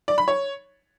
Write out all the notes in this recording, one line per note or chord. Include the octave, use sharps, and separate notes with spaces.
D5
B5
C#5